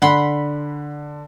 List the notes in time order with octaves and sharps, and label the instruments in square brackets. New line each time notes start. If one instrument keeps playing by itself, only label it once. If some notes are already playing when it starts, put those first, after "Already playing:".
[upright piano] D3 [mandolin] F#5 B5 C6